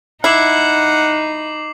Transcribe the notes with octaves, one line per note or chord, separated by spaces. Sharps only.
D#4 E4 F#5 D6 C7 F#7